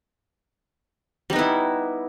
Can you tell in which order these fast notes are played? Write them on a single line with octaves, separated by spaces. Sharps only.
G3 D#4 B3 E4